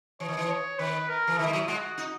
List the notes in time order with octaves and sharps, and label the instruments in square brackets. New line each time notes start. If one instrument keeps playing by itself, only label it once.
[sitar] E3 [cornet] C#5
[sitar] D#3
E3
[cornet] C#5
[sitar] D#3 [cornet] B4
[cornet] A#4
[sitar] E3
[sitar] D#3 [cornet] E4
[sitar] G#3
F#3
[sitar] G#3 [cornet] F#4
[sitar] D#4